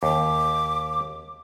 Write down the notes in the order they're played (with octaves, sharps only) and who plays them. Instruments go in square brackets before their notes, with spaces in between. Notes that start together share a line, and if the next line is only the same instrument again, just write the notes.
[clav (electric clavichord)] D#2 [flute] D6